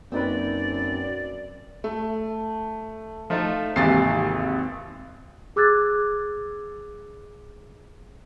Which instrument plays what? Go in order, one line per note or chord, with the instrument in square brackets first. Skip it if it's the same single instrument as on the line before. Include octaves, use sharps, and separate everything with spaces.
[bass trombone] F#2 [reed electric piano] A#3 D#4 B4 [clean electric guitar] C4 [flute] D5
[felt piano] A3
[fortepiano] F3 A3 D#4
[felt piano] G#1 A6 C7 [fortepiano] D#2 C3 E3
[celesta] G#4 D6 E6 F#6 G#6 A6